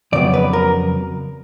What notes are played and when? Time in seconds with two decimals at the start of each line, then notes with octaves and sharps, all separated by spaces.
0.12 F2 C#3 F#3 B3 D5
0.34 B4
0.53 A#4